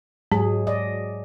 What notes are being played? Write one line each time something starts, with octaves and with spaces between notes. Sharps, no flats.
G#2 F#3 G#3 G#4
D5 D#5